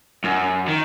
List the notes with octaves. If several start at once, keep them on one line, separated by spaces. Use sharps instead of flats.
F#2
D#3